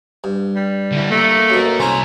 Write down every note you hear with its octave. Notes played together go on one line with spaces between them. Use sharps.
G2
G3
D3 E4
A3 A#3
F#2 B2
C2 C#4 E4 C5 A#5